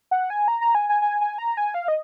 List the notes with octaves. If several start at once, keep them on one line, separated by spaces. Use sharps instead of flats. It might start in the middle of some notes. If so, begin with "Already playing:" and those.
F#5
G#5
A#5
A#5
G#5
G#5
G#5
G#5
A#5
G#5
F5
D#5